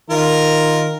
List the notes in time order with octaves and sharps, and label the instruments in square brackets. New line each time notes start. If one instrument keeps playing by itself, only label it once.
[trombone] D#3 [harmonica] F4 A#4